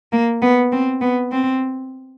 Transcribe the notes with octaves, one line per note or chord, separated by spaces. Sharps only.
A#3
B3
C4
B3
C4